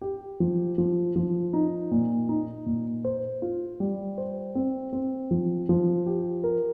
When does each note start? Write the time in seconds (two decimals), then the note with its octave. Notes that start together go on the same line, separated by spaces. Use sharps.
0.01 G4
0.40 F3
0.78 F3
1.16 F3
1.53 D#4
1.91 A#2
2.29 D#4
2.66 A#2
3.05 C5
3.42 F4
3.80 G3
4.18 C5
4.55 C4
4.93 C4
5.31 F3
5.69 F3
6.06 G4
6.44 A#4